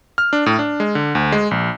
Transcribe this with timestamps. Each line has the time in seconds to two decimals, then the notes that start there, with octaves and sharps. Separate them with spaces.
0.18 F6
0.33 D4
0.46 A2
0.59 D4
0.80 G#3
0.95 D3
1.15 D2
1.32 G#3
1.51 A#1